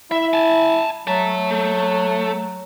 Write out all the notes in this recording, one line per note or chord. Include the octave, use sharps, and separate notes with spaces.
E4 E5
G#5 A5
F#3 E5 A5
A3